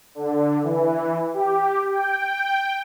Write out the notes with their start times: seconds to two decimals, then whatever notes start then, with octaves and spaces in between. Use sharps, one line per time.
0.15 D3
0.63 E3
1.34 G4
1.90 G5